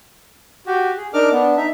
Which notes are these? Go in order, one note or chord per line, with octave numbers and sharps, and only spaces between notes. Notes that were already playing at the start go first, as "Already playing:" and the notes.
F#4 G4
G#4
D4 D#4 A#4 D6 F6
B3 D4
D#4 E5